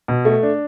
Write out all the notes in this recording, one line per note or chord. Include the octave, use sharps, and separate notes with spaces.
B2
A3
D4